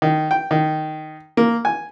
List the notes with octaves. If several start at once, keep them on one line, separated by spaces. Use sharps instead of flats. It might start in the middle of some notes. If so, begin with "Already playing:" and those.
D#3
G5
D#3
A#3
G#5